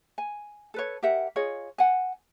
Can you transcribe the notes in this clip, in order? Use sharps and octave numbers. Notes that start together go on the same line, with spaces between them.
G#5
A4 B4 C#5
G4 A#4 E5 F#5
F4 G#4 C#5 D#5
F#5 G#5